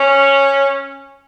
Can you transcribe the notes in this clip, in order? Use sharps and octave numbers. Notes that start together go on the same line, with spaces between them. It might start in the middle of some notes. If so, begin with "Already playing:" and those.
Already playing: C#4